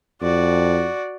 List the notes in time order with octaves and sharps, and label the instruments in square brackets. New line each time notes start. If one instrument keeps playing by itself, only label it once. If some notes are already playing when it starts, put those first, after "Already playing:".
[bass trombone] F2 [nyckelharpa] F#4 D5